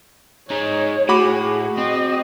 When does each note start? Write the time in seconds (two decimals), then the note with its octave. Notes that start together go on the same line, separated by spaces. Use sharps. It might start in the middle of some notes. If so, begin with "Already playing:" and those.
0.51 G#3 D#4 C#5
1.09 A2 F#4 G#4 B5 D6
1.77 C4 D#5